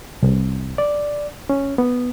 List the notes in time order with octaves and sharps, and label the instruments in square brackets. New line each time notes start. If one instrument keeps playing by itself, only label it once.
[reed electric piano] C2
D5
C#4
B3